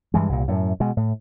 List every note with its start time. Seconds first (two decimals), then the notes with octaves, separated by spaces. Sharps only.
0.14 G2 E3 G#3
0.29 C2 A#2
0.48 F#2 A2
0.80 B2 G#3
0.97 A2